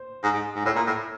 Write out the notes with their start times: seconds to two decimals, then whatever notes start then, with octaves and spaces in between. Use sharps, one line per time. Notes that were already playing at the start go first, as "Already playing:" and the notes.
Already playing: C5
0.24 G#2
0.34 G#2
0.55 G#2
0.65 A2 C#5
0.76 A#2
0.87 A2